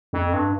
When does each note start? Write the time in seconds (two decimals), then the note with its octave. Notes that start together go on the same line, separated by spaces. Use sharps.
0.13 F2
0.33 G2